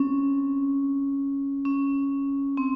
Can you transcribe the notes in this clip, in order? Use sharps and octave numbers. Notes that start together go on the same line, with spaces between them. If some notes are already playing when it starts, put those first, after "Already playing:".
Already playing: C4 C#4
C#4
C4